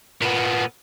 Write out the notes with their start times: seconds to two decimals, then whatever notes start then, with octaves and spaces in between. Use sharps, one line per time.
0.22 A#2 B3